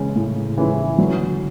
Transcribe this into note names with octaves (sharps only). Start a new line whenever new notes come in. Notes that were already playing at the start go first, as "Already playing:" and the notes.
Already playing: C#3 E3 G#3 C#4 E4
A2
E3 G#3 C#4 E4
D3 F#3